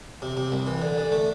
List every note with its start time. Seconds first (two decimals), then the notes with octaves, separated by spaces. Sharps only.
0.22 C3
0.37 C3
0.52 C2
0.67 E3
0.82 D3
0.98 D3
1.12 A3